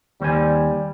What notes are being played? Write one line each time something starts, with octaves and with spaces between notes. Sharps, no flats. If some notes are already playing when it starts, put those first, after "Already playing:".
D#2 G3 C5 G#5